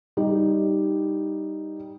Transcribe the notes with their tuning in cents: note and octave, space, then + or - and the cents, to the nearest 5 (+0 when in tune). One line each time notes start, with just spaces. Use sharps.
G3 +0 D#4 +0